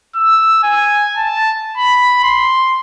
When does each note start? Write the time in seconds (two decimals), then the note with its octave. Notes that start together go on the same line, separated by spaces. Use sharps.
0.15 E6
0.63 G#5
1.17 A5
1.78 B5
2.24 C6